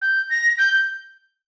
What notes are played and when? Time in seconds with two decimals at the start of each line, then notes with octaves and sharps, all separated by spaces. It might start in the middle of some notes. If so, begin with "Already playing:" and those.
0.02 G6
0.30 A#6
0.58 G6